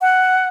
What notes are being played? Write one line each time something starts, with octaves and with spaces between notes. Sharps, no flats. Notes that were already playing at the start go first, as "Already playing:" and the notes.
F#5